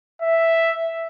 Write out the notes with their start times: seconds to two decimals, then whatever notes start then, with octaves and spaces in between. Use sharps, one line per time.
0.22 E5